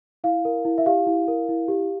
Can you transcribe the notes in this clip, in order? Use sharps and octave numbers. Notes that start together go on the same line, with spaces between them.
E4 F5
A#4
E4
E5
G4 F5
E4
A#4
E4
G4